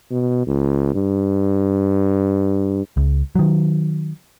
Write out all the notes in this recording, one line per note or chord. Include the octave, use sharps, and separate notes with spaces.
B2
C#2
G2
C#2
D#3 F#3